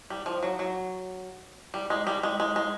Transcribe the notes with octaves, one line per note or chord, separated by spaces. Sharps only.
G3
F3
F#3
F#3
G3
G#3
G3
G#3
G#3
G#3